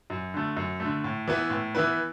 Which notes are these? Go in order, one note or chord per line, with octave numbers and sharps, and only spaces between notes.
F#2
D3 A3
F#2
D3 A3
A2
E3 B3 E4 B4
A2
E3 B3 E4 B4